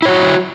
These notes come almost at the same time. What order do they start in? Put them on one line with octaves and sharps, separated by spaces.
E4 C#5 F#4